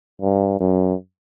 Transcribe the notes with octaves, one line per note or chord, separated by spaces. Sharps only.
G2
F#2